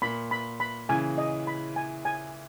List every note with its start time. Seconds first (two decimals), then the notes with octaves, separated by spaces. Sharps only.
0.02 A#2 B5
0.31 B5
0.60 B5
0.89 C#3 E3 G#5
1.18 D#5
1.47 B5
1.76 G#5
2.05 G#5